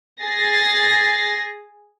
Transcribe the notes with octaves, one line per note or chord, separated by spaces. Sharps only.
G#4 A6 A#6 C7